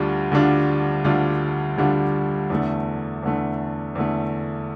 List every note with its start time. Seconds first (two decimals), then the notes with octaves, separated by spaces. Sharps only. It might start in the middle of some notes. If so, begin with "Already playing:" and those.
Already playing: D2 D3 G3 D4 F4
0.32 D2 D3 G3 D4 F4
1.05 D2 D3 G3 D4 F4
1.77 D2 D3 G3 D4 F4
2.50 E2 D3 A3
3.23 E2 D3 A3
3.95 E2 D3 A3